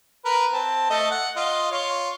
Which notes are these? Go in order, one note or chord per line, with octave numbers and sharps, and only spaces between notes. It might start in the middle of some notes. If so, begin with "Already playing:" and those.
A#4 B4
C4 A5
A3 D#5
F#5
F4 D#5
F4 C#5